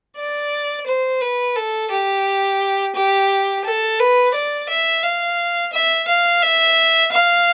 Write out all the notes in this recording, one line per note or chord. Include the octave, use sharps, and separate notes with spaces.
D5
C5
B4
A4
G4
G4
A4
B4
D5
E5
F5
E5
F5
E5
F5